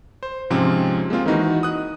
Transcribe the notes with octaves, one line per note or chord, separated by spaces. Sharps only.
C5
G#2 C3 F3 C4 C#4
G#3 A#3 C4 F4
D#3 E3 D#4 F#4
D#6 F#6